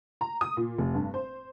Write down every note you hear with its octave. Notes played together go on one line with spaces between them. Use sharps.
A#5
D#6
A#2
F1
G2
C5